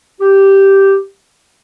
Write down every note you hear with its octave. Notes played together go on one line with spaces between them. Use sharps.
G4